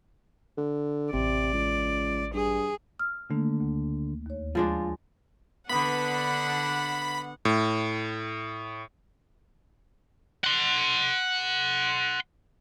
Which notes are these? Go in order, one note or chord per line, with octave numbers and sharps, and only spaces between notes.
D3
A1 C3 D5
C#2
G2 G#4
E6 F6
D3 D#3 A3 A#3
D2
D#2 C#5
F3 G#3 D4 F4
D3 B3 D4 F#5 B5
A2
F#5 C6